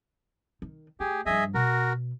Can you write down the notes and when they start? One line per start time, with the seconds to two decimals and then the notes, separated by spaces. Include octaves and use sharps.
0.62 D#3
1.00 A3 G4 G#4
1.26 G2 F3 G#4 D#5 E5
1.54 B2 F#4 A#4